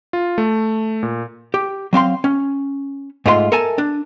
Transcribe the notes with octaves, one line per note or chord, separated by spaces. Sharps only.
F4
A3
A#2
G4
F#3 C4 F5 C6
C#4
G#2 A3 F4 C5 C6
A4 A#4 E5 G#5 A5
D4